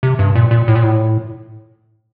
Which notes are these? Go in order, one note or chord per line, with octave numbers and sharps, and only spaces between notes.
C3
G2
A#2
A#2
A2
A#2
A2